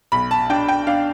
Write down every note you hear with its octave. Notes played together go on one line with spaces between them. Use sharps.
B1 B5
A5
D4 G5
G5
D4 F5